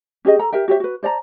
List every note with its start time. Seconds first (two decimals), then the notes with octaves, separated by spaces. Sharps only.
0.25 C#4 G4 G#4 D#5
0.39 A4 A#5
0.53 G4 A#4 E5 G5
0.68 F#4 G4 C#5 E5
0.80 F#4 B4
1.03 C5 D5 A5 A#5